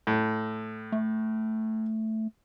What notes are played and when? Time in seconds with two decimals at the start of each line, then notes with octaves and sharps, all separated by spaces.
0.07 A2
0.92 A3